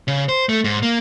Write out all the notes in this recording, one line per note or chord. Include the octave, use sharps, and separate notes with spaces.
C#3
C5
A3
G#2
A#3